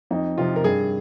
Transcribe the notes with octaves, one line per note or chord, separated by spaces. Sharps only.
F2 D#4
C3 F3 F4
A#4
G2 G#4